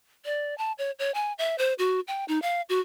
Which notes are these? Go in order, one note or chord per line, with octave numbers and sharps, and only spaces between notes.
D5
A5
C#5
C#5
G#5
E5
C5
F#4
G5
D#4
F5
F#4